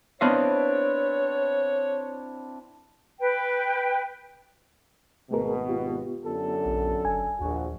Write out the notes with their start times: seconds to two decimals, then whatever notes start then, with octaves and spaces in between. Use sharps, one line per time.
0.21 B3 C4 D4 E4 C#5 D#5 F5
3.20 B4 G5
5.31 G#1 B2 A3 G#4 A#4
5.68 B3 F4 G4
6.26 F#2 D3 A4
6.65 A#1
7.05 F#1 G#5
7.40 A#1 D#2 F#4